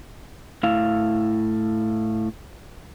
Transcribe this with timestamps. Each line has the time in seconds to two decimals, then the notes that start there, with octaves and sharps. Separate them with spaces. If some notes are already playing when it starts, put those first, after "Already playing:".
0.63 A2 E4 F5